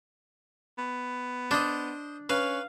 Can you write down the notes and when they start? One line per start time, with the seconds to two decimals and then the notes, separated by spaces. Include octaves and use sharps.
0.78 B3
1.51 D4 C5 D#5
2.29 C#4 B4 F5